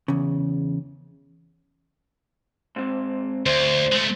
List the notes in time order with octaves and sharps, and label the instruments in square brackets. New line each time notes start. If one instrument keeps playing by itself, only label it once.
[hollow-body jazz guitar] E2 C#3
[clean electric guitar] G#2 C4
[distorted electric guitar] D2 [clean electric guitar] C5
[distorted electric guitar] G#3 A3